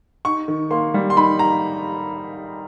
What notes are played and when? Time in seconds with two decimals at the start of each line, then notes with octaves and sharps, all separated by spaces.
0.25 D#4 C#6
0.48 D#3
0.71 A#3 C6
0.94 G3
1.10 C6
1.16 D#4 B5
1.39 A#5